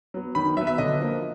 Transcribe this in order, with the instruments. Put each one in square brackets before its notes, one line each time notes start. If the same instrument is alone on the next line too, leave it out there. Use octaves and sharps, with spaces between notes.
[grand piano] F#3 B3
D#3 B5
F#3 B3 E5
E5
D3 D#5
F3 A#3